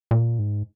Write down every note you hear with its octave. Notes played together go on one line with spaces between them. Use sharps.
A#2
G#2